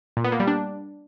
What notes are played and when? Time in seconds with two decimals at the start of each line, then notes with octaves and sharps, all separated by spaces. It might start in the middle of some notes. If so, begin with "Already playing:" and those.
0.17 A#2
0.24 B3
0.32 A#3
0.40 G3
0.47 D4